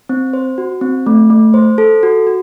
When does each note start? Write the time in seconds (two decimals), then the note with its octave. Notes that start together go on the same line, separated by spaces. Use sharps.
0.09 C4
0.33 C5
0.58 F#4
0.81 C4
1.06 A3
1.30 A3
1.54 C5
1.78 A4
2.03 F#4
2.27 F#4